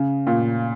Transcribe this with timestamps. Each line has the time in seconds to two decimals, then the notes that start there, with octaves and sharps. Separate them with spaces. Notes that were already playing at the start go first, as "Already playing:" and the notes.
Already playing: C#3
0.27 A#2